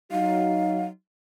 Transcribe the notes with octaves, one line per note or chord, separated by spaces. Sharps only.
F#3 D#4 F#4 F5